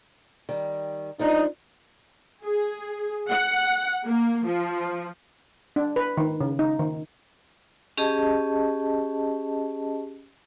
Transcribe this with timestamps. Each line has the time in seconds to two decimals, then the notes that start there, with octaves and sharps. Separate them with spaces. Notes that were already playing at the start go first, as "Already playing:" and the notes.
0.49 D#3 G3
1.19 F3 G#3 D4 D#4
2.43 G#4
3.29 F#5
4.04 A#3
4.45 F3
5.76 D4
5.96 B4
6.17 D#3
6.41 C#3
6.59 D#4
6.79 D#3
7.97 C#4 G4 G#4 D#5 A5